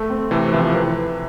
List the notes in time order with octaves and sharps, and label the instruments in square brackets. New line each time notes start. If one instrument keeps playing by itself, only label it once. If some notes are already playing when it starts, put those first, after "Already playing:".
Already playing: [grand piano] A3 A4
C4
[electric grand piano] C3 E3 [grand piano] A3
[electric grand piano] C3 E3 [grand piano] F3
[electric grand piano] C3 E3 [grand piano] B4